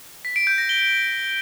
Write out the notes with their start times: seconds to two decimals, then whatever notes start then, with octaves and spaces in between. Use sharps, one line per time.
0.25 B6
0.36 D7
0.47 G6
0.58 A#6
0.69 G7